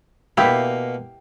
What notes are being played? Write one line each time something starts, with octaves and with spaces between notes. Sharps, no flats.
B2 A#3 E4 G4